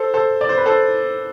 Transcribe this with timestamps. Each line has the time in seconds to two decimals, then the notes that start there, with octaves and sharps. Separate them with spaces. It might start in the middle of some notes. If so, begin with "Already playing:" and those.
Already playing: A4 C5
0.14 A4 C5
0.41 D5
0.49 C5
0.57 B4
0.65 A4 C5